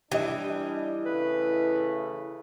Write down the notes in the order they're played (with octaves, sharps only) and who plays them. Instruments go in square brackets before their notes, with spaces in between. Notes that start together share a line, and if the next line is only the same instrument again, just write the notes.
[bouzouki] E3 [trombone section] G3 D4 [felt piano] G4 D#5
[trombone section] C#3 A3 E4 [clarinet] B4